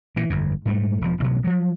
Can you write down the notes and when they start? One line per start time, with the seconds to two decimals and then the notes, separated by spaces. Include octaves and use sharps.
0.16 A#2 E3
0.30 G1 F2
0.66 G#2 G3 A3
1.01 E1 F3
1.20 A1 B2 F#3
1.44 F3 F#3